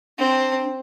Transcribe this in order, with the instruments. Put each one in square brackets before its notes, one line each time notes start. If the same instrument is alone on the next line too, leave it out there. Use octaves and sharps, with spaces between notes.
[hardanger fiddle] C4 [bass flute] D4